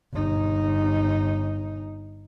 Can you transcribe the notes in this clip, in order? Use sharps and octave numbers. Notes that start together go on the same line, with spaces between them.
G1 D#4